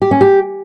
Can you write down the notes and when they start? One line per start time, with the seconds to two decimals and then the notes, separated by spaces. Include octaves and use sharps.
0.02 G4
0.11 C#4
0.21 G4